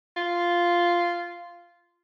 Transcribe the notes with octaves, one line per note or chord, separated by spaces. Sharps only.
F4